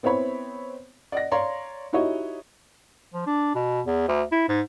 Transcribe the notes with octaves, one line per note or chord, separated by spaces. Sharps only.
B3 C4 E4 C#5 B5
D5 D#5 F#5 A#6
C#5 D5 F5 A#5 C6
D#4 E4 F#4 G4 C#5 D#5
F3
D4
B2
E2
D2
E4
G#2